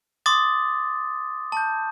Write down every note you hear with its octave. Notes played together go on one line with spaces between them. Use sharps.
C6 D6 D#6 A6
A5 G6